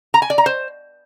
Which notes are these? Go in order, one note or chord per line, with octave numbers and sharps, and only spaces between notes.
A#5
G#5
D5
A#5
C5